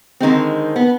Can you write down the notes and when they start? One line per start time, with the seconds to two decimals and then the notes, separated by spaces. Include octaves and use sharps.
0.20 D3 D#3 G#3 C4
0.76 B3